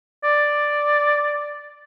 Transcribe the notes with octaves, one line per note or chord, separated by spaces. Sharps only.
D5